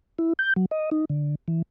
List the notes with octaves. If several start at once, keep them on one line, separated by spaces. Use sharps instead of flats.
E4
G6
F#3
D#5
D#4
D3
E3